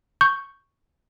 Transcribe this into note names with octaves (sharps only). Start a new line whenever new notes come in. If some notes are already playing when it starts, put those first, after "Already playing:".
C#6 G6